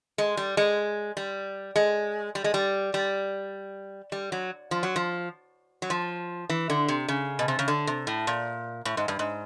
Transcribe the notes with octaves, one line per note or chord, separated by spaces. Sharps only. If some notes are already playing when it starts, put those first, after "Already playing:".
G#3
G3
G#3
G3
G#3
G3
G#3
G3
G3
G3
F#3
F3
F#3
F3
F#3
F3
E3
D3
C3
C#3
B2
C3
C#3
D3
C3
A2
A#2
A2
G#2
G2
G#2